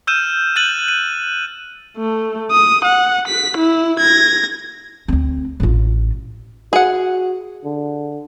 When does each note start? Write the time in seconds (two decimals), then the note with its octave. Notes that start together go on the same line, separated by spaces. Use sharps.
0.07 E6 F6 G6 D#7 E7
0.56 F#6 G6 A6 D#7 F#7
0.88 D#7
1.97 A3
2.51 D#6
2.84 F#5
3.28 B6
3.57 E4
4.00 G#6 A#6
5.08 D2 C4
5.60 A1 F4
6.73 F#4 G#4 F#5
7.64 D3